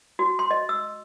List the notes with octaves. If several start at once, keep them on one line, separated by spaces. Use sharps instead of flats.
F#4
C6
D#5
E6